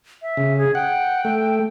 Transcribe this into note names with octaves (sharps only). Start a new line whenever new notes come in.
E5
C#3
G#4
F#5 G5
A3